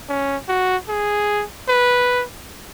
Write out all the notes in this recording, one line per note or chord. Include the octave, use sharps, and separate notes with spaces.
C#4
F#4
G#4
B4